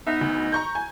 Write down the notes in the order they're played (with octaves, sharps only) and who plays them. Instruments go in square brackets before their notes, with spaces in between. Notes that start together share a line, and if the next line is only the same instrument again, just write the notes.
[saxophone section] B3 D#4 [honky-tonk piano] E5
[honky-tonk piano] D2
A#5 C#6 G6
G#5